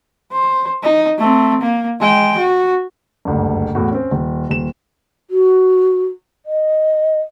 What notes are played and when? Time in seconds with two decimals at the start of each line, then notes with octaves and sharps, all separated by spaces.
0.32 C5
0.83 D#4
1.18 A3 C4
1.62 A#3
2.00 G#3 G5
2.38 F#4
3.25 F#1 D2 G2
3.75 E2 A2 F#4
3.92 C4 C#4
4.11 D#1
4.50 D#1 E7
5.31 F#4
6.46 D#5